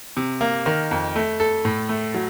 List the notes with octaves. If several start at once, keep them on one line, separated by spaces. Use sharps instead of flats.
C3
A#3
D#3
F2
A3
A4
A2
A3
F#3